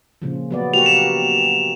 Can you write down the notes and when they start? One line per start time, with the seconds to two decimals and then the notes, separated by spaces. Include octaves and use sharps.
0.22 A#2 C#3 F3
0.51 F#3 B3 D5
0.74 A#3 F#4 G4 F7
0.86 E7